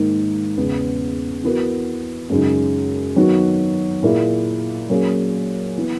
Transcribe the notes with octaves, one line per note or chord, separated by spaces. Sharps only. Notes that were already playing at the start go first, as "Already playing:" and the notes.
Already playing: G#2 D#3 A#3 D#4
E2 C#3 G#3 B3
E3 B3 F#4 A#4
F#2 C#3 G#3 D#4
D#3 F#3 B3 F#4
A#2 A#3 E4 G#4
F#3 A#3 C#4 G#4
E3 B3